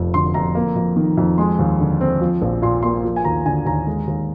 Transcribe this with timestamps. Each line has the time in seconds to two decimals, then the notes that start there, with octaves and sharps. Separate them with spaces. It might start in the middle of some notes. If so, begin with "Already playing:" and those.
Already playing: F1 F2 F3
0.14 D3 C6
0.34 F2 A#5
0.55 A#3
0.76 F2
0.96 D#3
1.18 F2
1.38 G#3 C6
1.59 D#2
1.80 D3
2.01 C4
2.21 F3
2.42 A#1
2.62 A#2 C6
2.83 A#3 C6
3.04 F3
3.16 G#5
3.25 D#2 A#5
3.45 D3 G#5
3.66 D#2 A#5
3.87 G#3
4.07 D#2